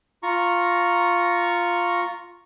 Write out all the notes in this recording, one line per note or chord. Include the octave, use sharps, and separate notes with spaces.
F4 A#5 C#6